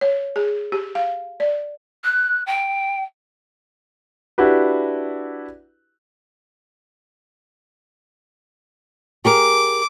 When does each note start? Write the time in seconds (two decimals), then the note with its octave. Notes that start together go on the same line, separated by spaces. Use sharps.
0.01 C#5
0.36 G#4
0.72 G4
0.95 F5
1.40 D5
2.04 F#6
2.46 G5
4.38 D4 E4 F#4 G4 B4
9.25 G4 G#4 A#4 D6